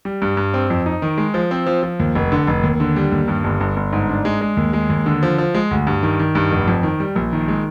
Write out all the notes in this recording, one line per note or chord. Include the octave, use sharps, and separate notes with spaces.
G3
G2
G2
C4
F2
D#4
D#3
G#3
F3
C4
F3
F3
D#2
F1
D3
F1
D#2
D3
G3
D#2
G2
G1
G1
G1
G#2
D4
G#3
G#3
D#2
G#3
D#2
D3
F3
F3
G#3
D2
G2
D#3
D#3
G2
F1
F2
D#3
G3
A#1
D#3
G#3